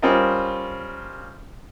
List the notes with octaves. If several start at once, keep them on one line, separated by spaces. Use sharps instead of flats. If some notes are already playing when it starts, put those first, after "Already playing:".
G3 C4 C#4 F4 A#4 D#5